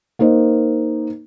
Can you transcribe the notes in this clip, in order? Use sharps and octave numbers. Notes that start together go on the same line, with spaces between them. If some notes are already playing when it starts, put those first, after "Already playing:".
A#3 D#4 A#4 C5